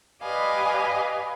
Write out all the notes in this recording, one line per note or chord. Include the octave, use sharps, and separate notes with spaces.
G4 B4 D5 D#5 F5 G#5